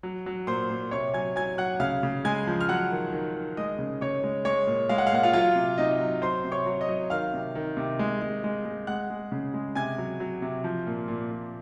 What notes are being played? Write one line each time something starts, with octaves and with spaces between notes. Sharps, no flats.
F#3
F#3
A#2 C5 C6
A#2
C3 C#5 C#6
F#3 G#5 G#6
F#3 G#5 G#6
F#3 F#5 F#6
C#3 F5 F6
C#3
G#3 G#5 G#6
F3
F6
F#3 F#5 F#6
D#3
D#3
D#3
G#3 D#5 D#6
C#3
C#3 C#5 C#6
G#3
G#3 C#5 C#6
A#2
G#3 F5
F#5
F5
A#2 F#5
F4 F5
F#3 F4 F5
C3
C3 D#4 D#5
F#3
F#3 C5 C6
C3
C#5 C#6
F#3
D#5 D#6
F#3
D#3 F5 F6
C3
D#3
C3
G#3
G#3
G#3
G#3
G#3 F#5 F#6
G#3
C#3
G#3
C3 G#5 G#6
F#3
F#3
C3
F3
A#2
A#2
A#2